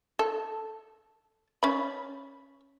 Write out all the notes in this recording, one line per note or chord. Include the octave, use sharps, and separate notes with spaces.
A4
C#4 B5